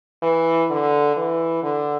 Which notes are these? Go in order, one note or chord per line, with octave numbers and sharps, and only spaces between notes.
E3
D3
E3
D3